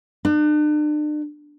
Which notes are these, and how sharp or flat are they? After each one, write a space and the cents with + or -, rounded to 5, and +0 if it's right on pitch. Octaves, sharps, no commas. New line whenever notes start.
D4 +40